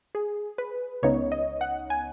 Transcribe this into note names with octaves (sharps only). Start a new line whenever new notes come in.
G#4
B4
C#2 C#3 B3 D#4 C#5
D#5
F#5
G#5